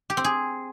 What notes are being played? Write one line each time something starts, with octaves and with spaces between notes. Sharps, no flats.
G4
C4
G#4